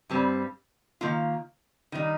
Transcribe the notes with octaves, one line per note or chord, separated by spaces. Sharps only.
G2 G3 C4
D#3 A#3 F4
D#3 G3 D#4